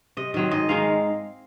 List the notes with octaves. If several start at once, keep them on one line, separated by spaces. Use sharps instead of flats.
C3 D#5
D#3 F#3 C4 D#5
G#2 D#5
D#3 G#3 D#4 F5